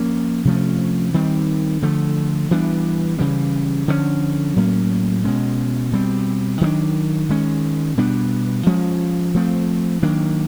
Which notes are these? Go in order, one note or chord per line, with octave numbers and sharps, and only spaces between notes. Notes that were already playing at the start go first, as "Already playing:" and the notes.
Already playing: F3 A#3 C#4
C3 F3 A3 C#4
D#3 G3 C4
D3 F3 A3
E3 G3 B3 D4
C#3 E3 G3
D3 F3 A3 C#4
A2 F#3 A#3 C#4
B2 G#3 C#4
B2 G3 C4
D#3 F#3 A3 D4
D#3 G#3 C#4
B2 G3 B3 D4
F3 G#3 C#4
F3 A3 C4
D#3 F#3 A#3 D4